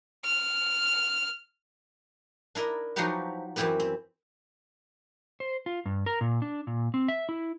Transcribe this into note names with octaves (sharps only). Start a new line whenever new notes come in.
F6
D4 E4 A#4 D#5
F3 F#3 D#4 F#4 G4 B4
F#2 E3 C4 E4 G4 B4
C4
C5
F4
G2
A#4
A#2
D4
A#2
C4
E5
E4